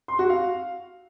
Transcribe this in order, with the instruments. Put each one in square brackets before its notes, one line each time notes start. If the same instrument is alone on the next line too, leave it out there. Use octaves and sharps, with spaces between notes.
[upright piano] C6
F#4
F5